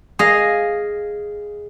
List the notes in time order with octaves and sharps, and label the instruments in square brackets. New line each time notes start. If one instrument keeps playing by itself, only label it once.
[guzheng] G#4 D#5 F5